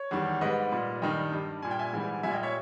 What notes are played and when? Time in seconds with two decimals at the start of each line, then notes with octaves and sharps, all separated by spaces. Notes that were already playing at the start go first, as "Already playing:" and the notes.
Already playing: C#5
0.11 E2 D#3 G3
0.41 G#2 G3 B4 D#5
0.72 A#2 G3
1.02 G2 D#3 G3 D#5 G5
1.32 G2 G3
1.62 A#2 G3 G#5
1.71 G5
1.79 E5 G#5
1.93 G#2 E3 G3
2.23 A#2 G3 E5 G#5
2.33 D#5 G5
2.43 C#5 E5